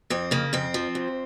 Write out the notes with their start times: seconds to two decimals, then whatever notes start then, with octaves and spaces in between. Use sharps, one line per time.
0.10 F2 C4
0.31 C#3 A#3
0.53 F2 C4
0.74 F3
0.95 F2